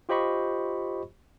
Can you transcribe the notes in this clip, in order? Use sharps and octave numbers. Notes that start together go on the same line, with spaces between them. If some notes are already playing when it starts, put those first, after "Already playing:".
F4 G4 C5 D#5 B5 C#6